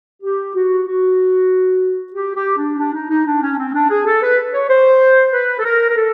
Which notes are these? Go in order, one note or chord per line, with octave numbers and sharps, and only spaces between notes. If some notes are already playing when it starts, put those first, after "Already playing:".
G4
F#4
F#4
G4
G4
D4
D4
D#4
D#4
D4
C#4
C4
D4
G#4
A4
B4
C#5
C5
B4
A4
A#4
A#4
A4